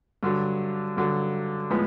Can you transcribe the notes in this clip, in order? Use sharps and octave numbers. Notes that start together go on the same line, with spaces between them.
G2 D3 F#3
G2 D3 F#3
A2 F3 G#3 B3